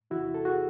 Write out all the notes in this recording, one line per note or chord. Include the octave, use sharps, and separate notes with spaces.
E2 C3 E3 E4 F#4
A4
F#4 G#4